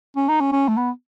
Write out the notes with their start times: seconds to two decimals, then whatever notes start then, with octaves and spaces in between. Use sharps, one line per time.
0.16 C#4
0.29 D#4
0.40 C#4
0.52 C#4
0.68 A3
0.77 B3